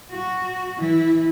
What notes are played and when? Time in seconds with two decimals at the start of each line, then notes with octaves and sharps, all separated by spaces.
0.11 F#4
0.78 E3 E4